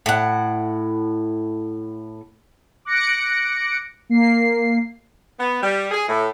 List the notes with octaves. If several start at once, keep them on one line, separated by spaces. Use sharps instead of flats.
A2 F#5
D6 F#6 A#6 C#7 D7
A#3 C7
B3
G3
G#4
A2